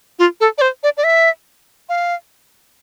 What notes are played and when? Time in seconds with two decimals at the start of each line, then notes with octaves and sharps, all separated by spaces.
0.19 F4
0.40 A4
0.58 D5
0.61 C5
0.83 D5
0.97 D5
1.04 E5
1.89 F5